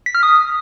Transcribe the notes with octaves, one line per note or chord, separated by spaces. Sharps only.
B6
F6
D#6